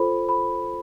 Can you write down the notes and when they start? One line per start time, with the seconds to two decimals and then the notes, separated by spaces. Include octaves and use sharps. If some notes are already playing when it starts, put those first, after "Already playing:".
Already playing: F4 A4 C5 B5
0.29 B5